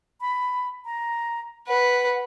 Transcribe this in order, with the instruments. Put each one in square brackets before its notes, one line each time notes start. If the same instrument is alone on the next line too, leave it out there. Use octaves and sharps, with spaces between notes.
[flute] B5
A#5
[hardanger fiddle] B4 [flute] F#5